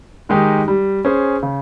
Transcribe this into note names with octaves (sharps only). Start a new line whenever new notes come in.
D#3 G#3 D#4 G4
G3
C#4 G#4 C5
C#3